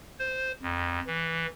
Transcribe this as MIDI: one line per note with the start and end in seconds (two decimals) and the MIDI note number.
0.19 0.52 72
0.62 1.00 41
1.07 1.46 52